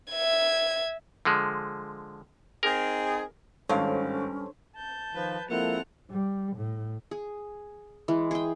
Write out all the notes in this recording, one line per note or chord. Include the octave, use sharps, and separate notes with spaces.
E5 G#6
D3 F3 G#3
C4 D#4 G#4 A#4
G#1 G2 C#4 A4 C5 C#5 F5
A5 G6
D#3 F3 B4
F3 G#3 A#3 C4 E4 A4 F#5 F7
G3
A2
G#4
E3 G#3
G#4 G5